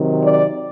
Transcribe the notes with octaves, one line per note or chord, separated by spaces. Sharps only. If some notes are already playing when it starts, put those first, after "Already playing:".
Already playing: C3 D#3 F#3
D5